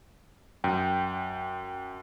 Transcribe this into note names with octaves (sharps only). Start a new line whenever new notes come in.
F#2 G5